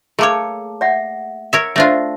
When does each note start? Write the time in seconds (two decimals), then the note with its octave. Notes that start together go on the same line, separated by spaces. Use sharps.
0.19 A3 A#3 G#4 C#5 A5 D6
0.81 D5 E5 F#5
1.53 A#4 C#5 E5
1.76 A3 D4 F4 C5 E5